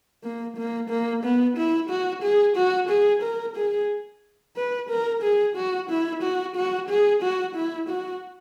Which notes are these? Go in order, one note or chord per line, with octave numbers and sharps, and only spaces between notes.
A#3
A#3
A#3
B3
E4
F#4
G#4
F#4
G#4
A#4
G#4
B4
A#4
G#4
F#4
E4
F#4
F#4
G#4
F#4
E4
F#4